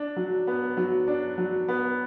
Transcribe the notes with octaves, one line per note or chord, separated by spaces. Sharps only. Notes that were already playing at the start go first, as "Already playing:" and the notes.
Already playing: D4
F#3
B3
F#3
D4
F#3
B3